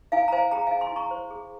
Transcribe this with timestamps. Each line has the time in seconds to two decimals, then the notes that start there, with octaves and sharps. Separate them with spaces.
0.12 E4 F5 G#5
0.28 A#5
0.32 C5 F5 G#5
0.51 G#4 G5 A#5
0.67 F5 G#5
0.71 E4
0.81 G#5 C6
0.92 E4 A#5 C#6
1.11 C5
1.31 G#4